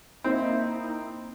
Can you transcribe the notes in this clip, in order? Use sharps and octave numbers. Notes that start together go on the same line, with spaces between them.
A#3 C4 D#4 E4